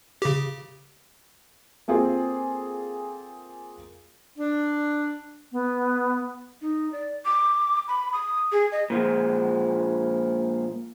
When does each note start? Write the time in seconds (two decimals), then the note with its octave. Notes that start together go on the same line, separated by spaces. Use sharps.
0.22 C#3 G4
1.88 A#3 C4 F4 G#4 A4
4.38 D4
5.52 B3
6.61 D#4
6.92 D5
7.25 D6
7.88 B5
8.13 D#6
8.52 G#4
8.72 D#5
8.90 A#2 F3 G#3